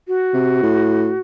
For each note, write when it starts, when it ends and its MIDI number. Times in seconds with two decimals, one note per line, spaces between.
0.08 1.21 66
0.33 0.58 48
0.63 1.13 45